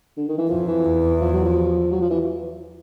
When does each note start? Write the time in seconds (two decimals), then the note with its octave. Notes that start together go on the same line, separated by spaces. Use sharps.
0.17 D3
0.28 D#3
0.38 E3
0.50 F2 F3
0.67 E3
0.85 E2
1.21 F3
1.33 F#3
1.45 F3
1.92 F#3
2.01 F3
2.10 E3